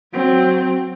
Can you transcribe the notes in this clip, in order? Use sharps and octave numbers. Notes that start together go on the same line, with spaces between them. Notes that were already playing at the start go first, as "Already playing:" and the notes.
F#3 C4